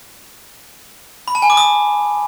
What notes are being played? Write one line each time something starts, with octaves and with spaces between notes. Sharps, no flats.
B5
A5
G#5
D6
D#6